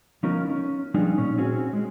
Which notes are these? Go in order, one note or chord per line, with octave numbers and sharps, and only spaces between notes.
F3 B3 C#4 D#4 F4 A#4
C#4
F3 G3 B3 D4 D#4 G#4
A#2 C#4
C4 C#4 F#4 G#4
G#3